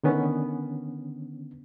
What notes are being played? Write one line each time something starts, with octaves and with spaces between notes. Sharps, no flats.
D3 D#3 B3 C#4